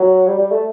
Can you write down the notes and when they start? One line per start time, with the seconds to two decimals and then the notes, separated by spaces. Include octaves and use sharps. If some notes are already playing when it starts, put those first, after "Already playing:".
Already playing: F#3
0.27 G3
0.38 G3
0.52 A3